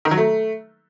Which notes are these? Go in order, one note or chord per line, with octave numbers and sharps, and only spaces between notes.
D#3
F#3
A3